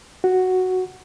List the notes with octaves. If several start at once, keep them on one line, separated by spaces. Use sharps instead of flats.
F#4